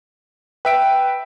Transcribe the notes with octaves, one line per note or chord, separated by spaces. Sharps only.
B4 E5 G5 D7